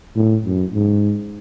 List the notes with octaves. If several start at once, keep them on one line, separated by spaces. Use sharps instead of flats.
A2
F#2
G#2